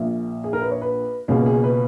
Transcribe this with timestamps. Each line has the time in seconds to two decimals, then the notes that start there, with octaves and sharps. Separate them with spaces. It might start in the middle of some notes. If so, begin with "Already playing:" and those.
Already playing: A#1 A#2 A#3 E5
0.44 G#4
0.53 A#4
0.62 B4
0.71 C#5
0.82 B4
1.28 C#2 B2 A#3 C#4 G#4
1.46 G#4
1.64 B4